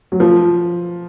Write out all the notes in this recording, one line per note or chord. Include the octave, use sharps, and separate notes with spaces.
F#3
F3